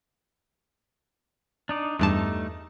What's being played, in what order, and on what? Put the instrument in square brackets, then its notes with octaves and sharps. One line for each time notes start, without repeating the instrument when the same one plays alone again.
[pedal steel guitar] D4 D#4 D5
[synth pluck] E2 G2 A5 [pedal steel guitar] G3 A3 D#4